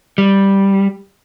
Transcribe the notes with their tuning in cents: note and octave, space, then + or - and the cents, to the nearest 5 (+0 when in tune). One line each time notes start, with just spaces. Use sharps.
G3 +0